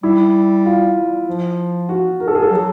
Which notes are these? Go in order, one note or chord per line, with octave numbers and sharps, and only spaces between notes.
G3 E4
F4
F3
F#4
A#4
A4
G#4
A4
F#3